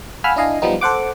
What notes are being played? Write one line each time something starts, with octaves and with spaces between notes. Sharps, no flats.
F5 F#5 G#5 B5 E6 F6
D4 E4 D#5 F5 G#5
F3 G3 B3 D#4
A4 C5 F#5 D6